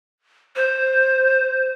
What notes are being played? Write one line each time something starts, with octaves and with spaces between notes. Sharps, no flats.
C5